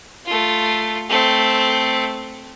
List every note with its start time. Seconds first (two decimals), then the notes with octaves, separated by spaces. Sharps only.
0.26 A3 F4
1.09 A3 C4